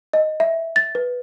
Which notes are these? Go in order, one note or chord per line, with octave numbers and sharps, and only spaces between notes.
D#5
E5
A6
B4